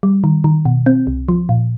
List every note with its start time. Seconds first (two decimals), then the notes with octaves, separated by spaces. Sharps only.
0.03 G3
0.24 D#3
0.44 D#3
0.65 B2
0.86 C4
1.07 C2
1.29 F3
1.49 A#2